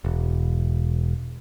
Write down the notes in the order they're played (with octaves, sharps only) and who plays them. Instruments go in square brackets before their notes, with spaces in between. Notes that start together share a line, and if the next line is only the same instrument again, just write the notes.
[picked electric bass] E1